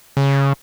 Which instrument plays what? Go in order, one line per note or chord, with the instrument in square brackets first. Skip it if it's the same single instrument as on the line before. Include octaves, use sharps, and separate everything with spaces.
[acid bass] C#3